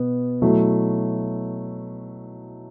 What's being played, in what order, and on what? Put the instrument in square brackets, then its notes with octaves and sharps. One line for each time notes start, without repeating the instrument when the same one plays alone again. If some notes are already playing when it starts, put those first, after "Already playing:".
Already playing: [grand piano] B2 B3
B2 F#3 A3 E4